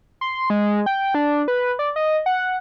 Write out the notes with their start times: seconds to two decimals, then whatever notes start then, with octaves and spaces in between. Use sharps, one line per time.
0.21 C6
0.50 G#3
0.86 G5
1.15 D4
1.48 B4
1.79 D5
1.96 D#5
2.26 F#5